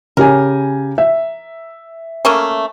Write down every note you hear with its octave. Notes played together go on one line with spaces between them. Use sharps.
C#3 G4 A#4 G#5
E5
A3 A#3 C#4